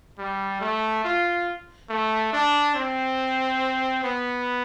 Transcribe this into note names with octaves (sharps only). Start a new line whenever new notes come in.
G3
A3
F4
A3
D4
C4
B3